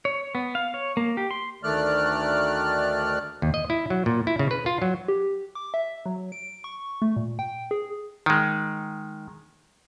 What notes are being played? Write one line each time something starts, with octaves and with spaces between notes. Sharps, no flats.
C#5
B3
F5
C#5
A#3
G4
C6
D2 D#3 A3 D5 F6 F#6
D#2
D#5
E4
F#3
A#2
E4
C#3
B4
F4
F#3
G4
D6
E5
F#3
D7
C#6
A3
A#2
G5
G#4
D#3 G#3